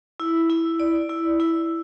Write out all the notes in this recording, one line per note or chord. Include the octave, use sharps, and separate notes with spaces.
E4
E4
D5
E4
E4